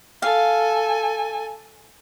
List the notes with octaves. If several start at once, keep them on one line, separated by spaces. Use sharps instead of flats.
A4 F5 G#5